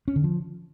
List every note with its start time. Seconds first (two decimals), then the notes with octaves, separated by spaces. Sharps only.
0.08 C#4
0.16 D3
0.24 F3